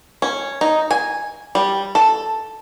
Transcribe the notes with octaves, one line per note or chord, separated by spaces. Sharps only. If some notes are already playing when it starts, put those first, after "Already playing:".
C#4
D#4
G#5
G3
A4